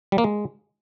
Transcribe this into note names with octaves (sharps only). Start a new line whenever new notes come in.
G3
A#3
G#3